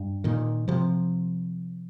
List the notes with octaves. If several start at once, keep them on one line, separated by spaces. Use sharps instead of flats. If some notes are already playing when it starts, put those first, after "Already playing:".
Already playing: G2
A#2 D#3
C3 F3